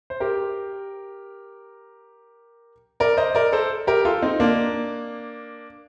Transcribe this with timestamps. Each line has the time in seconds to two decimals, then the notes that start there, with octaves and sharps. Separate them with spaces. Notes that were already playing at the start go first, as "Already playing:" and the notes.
0.10 C5
0.20 G4 A#4
3.00 A#4 D5
3.17 C5 D#5
3.35 A#4 D5
3.52 A4 C5
3.87 G4 A#4
4.05 F4 A4
4.22 C4 D#4
4.40 A#3 D4